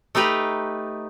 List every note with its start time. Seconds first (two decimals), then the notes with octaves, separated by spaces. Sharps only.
0.15 A3 D#4 G4 B4 A#5